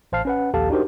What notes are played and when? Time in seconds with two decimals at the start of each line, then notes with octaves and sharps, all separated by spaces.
0.12 A1 C5 F5 A5 F6 C7
0.25 C#4 B4 F#5
0.54 A#1 D#2 G4 A4 F5 A5
0.70 D4 D#4 F#4 G4 A#4 C5